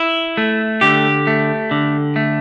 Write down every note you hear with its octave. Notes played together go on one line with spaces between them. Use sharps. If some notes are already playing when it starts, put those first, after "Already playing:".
Already playing: E4
A3
D3 G4
A3
D3
A3